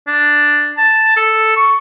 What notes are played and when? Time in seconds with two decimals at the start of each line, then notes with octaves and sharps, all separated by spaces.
0.07 D4
0.77 A5
1.16 A4
1.56 C#6